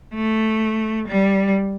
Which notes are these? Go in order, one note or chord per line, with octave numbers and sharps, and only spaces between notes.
A3
G3